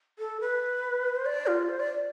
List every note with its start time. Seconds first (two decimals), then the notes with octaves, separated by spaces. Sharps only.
0.19 A4
0.40 B4
1.16 C5
1.26 D5
1.47 F4
1.69 C5
1.80 D5